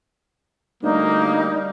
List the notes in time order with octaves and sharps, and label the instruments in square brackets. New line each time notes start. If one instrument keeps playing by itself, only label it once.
[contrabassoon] D2 [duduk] G3 [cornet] A#3 [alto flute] D#4